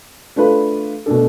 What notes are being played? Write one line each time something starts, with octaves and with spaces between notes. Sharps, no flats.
A3 D4 F4 B4
B2 A3 D4 A4